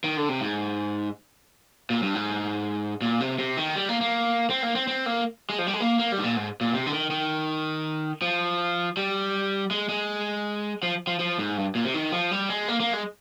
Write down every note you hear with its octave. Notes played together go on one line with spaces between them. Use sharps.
D#3
D3
C3
G#2
A#2
G2
G#2
A#2
C3
C3
D#3
G3
A#3
A#3
C4
A#3
C4
C4
A#3
G#3
F3
G3
G#3
A#3
A#3
G3
G#2
A#2
G#2
A#2
C3
D3
D#3
D#3
F3
G3
G#3
G#3
F3
F3
F3
G#2
G2
A#2
C3
D#3
F3
G3
G#3
A#3
A#3
G#3